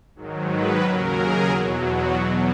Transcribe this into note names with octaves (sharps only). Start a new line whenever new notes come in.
G#2 D#3 F#3
B4
D#2 C#3 F#3 A#4
G#4
E2 B2 F#3
F#4
E2 B2 F#3